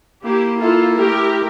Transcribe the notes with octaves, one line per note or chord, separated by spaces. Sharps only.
A#3 E4 G4
E4 F4 A4
A3 G4 A#4